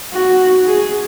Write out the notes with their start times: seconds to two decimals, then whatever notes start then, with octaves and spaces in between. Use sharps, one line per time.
0.13 F#4
0.67 G#4